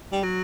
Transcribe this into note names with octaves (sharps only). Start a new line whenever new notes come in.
G3
F#3